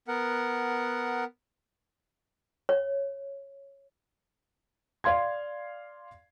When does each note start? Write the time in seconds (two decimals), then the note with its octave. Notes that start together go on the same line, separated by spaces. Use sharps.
0.08 B3 A#4 F#5
2.69 C#5
5.04 D5 F5 C6 G#6